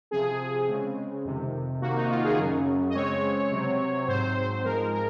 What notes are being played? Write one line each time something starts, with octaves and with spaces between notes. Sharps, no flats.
C3 F3 C4 G#4
C#3 G#3 C4
F2 C3 D#3
C3 D#3 A#3 F#4
D#4
F4
G#4
F#2 C#3 F#3
D#5
C#3 G#3 C4 C#5
C3 F#3 C4
G#2 F#3 C4 C5
G#2 F3 G#3 A#4
A#4